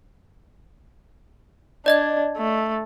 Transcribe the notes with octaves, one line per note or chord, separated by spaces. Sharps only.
D4 D5 D#5 G#6
A3